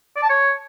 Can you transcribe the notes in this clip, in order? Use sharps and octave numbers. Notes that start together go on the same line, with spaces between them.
D5
A5
C#5